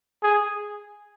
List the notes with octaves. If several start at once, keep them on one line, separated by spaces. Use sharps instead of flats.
G#4